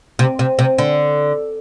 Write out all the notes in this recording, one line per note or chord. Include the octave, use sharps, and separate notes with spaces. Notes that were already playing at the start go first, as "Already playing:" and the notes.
C3
C3
C3
D3